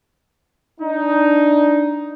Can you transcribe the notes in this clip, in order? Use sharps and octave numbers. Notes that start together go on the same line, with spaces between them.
D4 D#4